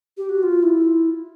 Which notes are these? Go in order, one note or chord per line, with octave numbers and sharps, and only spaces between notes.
G4
F#4
F4
E4